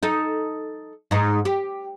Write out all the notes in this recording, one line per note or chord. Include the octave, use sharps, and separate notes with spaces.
D#4 A4
G#2 D#4
G4